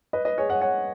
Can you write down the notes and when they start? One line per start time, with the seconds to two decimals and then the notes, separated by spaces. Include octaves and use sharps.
0.13 B4 D#5
0.25 B4 D#5
0.38 G#4 C#5
0.50 C#5 F#5
0.61 C#5 F#5